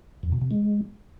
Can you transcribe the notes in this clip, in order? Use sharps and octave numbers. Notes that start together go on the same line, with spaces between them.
F2
B2
C3
G#3